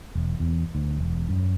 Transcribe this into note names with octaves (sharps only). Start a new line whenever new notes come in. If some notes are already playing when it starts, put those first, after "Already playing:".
E1
E2
D2
E1
F#2